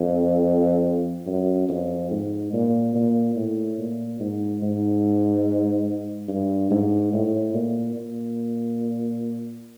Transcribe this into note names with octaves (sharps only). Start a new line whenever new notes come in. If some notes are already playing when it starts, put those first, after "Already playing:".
Already playing: F2
F#2
F2
G#2
A#2
A#2
A2
A#2
G#2
G#2
G2
G#2
A2
A#2
A#2